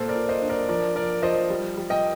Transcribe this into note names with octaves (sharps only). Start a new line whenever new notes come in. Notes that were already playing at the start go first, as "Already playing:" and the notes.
Already playing: A#2 A4 C5
A#4 D5
F4
C5 D#5
D4
A#4 D5
F3 A#4 D5
F3 A#4 D5
F3 C5 D#5
G3
G3
D#5 G5